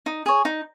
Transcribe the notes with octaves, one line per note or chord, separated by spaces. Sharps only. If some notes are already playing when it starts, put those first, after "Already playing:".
D#4
G#4 C#5
D#4